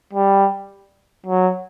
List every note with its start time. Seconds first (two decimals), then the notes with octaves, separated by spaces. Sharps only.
0.13 G3
1.26 F#3